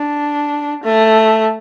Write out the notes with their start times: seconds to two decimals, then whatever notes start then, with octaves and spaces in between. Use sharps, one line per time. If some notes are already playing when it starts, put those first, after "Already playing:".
Already playing: D4
0.83 A3